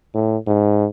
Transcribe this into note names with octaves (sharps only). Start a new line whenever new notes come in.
A2
G#2